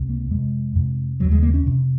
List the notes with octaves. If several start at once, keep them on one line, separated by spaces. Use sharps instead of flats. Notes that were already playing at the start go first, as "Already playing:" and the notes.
Already playing: C#2 C3
A#3
F2 C3 G#3
F2 C3
D#2 C#3 F#3
G#3
A#3
C#4
F2 C3